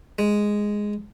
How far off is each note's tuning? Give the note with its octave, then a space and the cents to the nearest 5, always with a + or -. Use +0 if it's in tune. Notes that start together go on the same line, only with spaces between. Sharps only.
G#3 +0